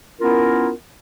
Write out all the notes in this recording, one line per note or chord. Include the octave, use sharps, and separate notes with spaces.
B3 C#4 E4 F4 A#4